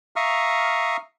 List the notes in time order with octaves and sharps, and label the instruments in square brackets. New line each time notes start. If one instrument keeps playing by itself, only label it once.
[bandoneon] E5 F5 A#5 C#6 D#6 F6